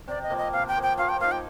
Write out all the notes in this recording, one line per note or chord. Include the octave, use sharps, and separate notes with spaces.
C3 D5
D#5
F3 A#3
D#5
C3 F5
G5
F3 A#3
G5
F3 F5
G5
A#3 D#4 F5
G5